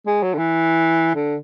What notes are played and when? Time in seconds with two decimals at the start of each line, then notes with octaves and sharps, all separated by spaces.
0.07 G#3
0.23 F#3
0.34 D3
0.38 E3
1.15 D3